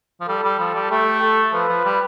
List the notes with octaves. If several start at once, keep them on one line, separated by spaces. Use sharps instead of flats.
F3
G3 A4
G3
F3
G3
A3 G4
A4
F3 B4
F3
G3